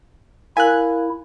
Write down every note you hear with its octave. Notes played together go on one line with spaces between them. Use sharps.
E4 A#4 F5 G#5 F#6